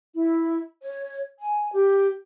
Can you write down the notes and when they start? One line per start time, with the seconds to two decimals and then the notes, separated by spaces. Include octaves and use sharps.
0.15 E4
0.82 C#5
1.39 G#5
1.73 G4